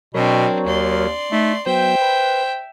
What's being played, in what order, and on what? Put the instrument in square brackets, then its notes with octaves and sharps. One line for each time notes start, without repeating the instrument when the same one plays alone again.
[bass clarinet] B2 [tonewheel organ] F#3 A#4 C#5 [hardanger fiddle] C4 D4
[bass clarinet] D#2 [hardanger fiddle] D5 C6
[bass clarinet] A3 [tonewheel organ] D#4
[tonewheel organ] F#3 B3 [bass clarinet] C5 [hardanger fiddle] E5 G5
[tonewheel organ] B4